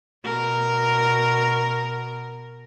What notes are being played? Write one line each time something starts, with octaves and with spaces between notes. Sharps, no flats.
B2 A#4